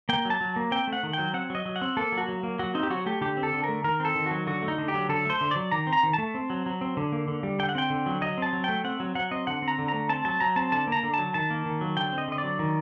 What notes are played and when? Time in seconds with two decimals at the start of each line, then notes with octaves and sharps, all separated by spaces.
0.09 A#3 G5
0.25 F#3
0.30 A5
0.41 F#3
0.56 A#3
0.71 C4 G5
0.88 A3
0.93 F#5
1.03 D#3
1.13 G5
1.18 F#3
1.34 C4 F#5
1.50 F#3 D#5
1.66 F#3
1.76 F#5
1.82 C4
1.97 A#3 A4
2.12 F#3
2.18 F#4
2.29 F#3
2.43 A#3
2.59 F#3 F#4
2.75 C4 D#4
2.83 G4
2.90 F#3 F#4
3.06 A3 G4
3.21 D3 G4
3.37 C4
3.43 A4
3.53 D3
3.64 A#4
3.69 A3
3.84 D#3 A#4
4.00 C4 A4
4.15 D#3
4.26 F#3 F#4
4.47 D3 F#4
4.62 A3
4.68 D#4
4.78 D3
4.88 G4
4.94 F#3
5.09 D3 A4
5.25 A3 C5
5.41 D3
5.51 F#3 D5
5.71 D#3 A#5
5.87 C4
5.93 A#5
6.03 D#3
6.13 A3 A5
6.34 C4
6.50 F#3
6.66 F#3
6.81 C4
6.97 D3
7.12 A#3
7.28 D3
7.43 G3
7.59 D3 G5
7.69 F#5
7.75 C4 G5
7.90 D3
8.06 F#3
8.21 F#3 D#5
8.38 C4 A5
8.53 F#3
8.64 A3 G5
8.84 C4 F#5
9.00 F#3
9.15 F#3 F#5
9.31 C4 D#5
9.47 D3 F#5
9.62 C4
9.68 A#5
9.79 D3
9.88 A#5
9.94 A3
10.09 C4 A5
10.25 F#3 A5
10.40 F#3 A#5
10.56 C4 A5
10.72 D3 A5
10.87 A#3 A#5
11.03 D3
11.14 F#3 A5
11.34 D#3 A5
11.50 A#3
11.66 D#3
11.81 F#3
11.97 D3 G5
12.13 C4 D#5
12.28 D3 D#5
12.38 D5
12.44 F#3
12.59 D#3